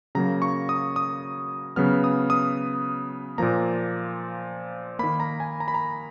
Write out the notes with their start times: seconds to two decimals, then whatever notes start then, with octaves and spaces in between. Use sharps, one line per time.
0.15 C#3 F#3 A#3 A#5
0.42 C#6
0.69 D#6
0.96 D#6
1.76 C#3 F#3 B3 F6
2.04 D#6
2.30 D#6
3.38 A#2 F3 A#3 A#5
4.99 D#3 A#3 B5
5.20 A#5
5.40 G#5
5.60 A#5
5.68 B5
5.74 A#5